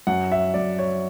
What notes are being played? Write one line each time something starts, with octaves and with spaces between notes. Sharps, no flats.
F#2 F#5
E5
F#2 D5
C#5